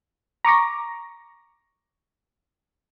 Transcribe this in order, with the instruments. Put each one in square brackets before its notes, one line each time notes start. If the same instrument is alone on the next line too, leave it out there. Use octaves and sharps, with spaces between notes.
[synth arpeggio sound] A#5 C#6 D6 A#6